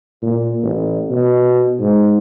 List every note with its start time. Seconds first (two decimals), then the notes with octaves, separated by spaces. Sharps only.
0.23 A#2
0.63 A1
1.10 B2
1.80 G#2